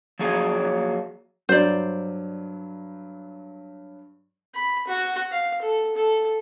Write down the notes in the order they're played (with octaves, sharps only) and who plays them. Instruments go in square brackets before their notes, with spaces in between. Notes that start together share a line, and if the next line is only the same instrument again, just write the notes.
[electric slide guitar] F3 F#3 A#3 G#4 C#5
[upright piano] G2 F#3 [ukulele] C5 D5
[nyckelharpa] B5
F#4
F5
A4
A4